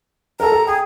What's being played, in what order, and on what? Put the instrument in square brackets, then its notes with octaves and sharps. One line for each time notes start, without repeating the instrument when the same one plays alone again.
[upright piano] A4 A#4 [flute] A#5
[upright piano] A4
[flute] G#4 [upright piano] G5